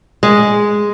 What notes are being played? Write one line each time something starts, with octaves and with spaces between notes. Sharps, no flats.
G#3